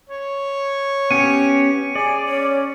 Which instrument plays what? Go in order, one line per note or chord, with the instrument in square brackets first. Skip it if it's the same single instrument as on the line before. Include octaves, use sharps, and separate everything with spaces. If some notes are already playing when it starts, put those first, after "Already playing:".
[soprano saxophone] C#5
[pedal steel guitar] B3 C#4 G4 [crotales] C#7 D#7
[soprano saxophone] G#4 [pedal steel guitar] D5
[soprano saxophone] C#4 [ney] C#5